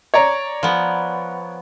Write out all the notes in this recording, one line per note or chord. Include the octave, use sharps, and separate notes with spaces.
C#5 D5 A#5
F3 B3